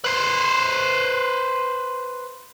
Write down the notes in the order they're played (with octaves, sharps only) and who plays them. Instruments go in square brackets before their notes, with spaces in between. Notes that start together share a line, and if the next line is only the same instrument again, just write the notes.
[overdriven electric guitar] B4 C5